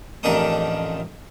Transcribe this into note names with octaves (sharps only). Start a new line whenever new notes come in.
A1 F2 D#3 D4 D#4 D#6